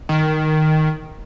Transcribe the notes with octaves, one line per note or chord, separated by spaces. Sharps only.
D#3